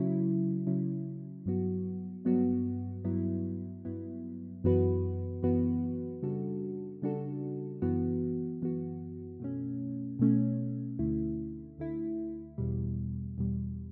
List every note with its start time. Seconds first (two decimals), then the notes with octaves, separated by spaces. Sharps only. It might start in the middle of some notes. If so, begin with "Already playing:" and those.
Already playing: C#3 F#3 C#4 E4
0.67 C#3 F#3 C#4 E4
1.46 G2 F#3 B3 F#4
2.25 G2 F#3 B3 F#4
3.04 G2 F#3 B3 E4
3.85 G2 F#3 B3 E4
4.64 F#2 E3 B3 F#4 B4
5.43 F#2 E3 B3 F#4 B4
6.22 C#3 G3 D4 F#4 A4
7.02 C#3 G3 D4 F#4 A4
7.82 F#2 E3 B3 F#4
8.61 F#2 E3 B3 F#4
9.40 B2 A3 C#4
10.19 B2 A3 C#4
10.99 D2 D3 A3 E4
11.78 D2 D3 A3 E4
12.58 E2 B2 G3
13.38 E2 B2 G3